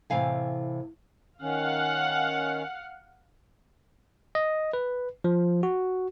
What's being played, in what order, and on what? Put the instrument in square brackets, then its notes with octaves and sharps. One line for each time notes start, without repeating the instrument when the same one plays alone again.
[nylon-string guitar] A2 C3 E3 F5 G#5
[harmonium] D#3 C#4 [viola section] F5 F#5
[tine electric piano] D#5
B4
F3
F#4